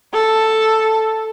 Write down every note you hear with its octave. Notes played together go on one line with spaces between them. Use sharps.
A4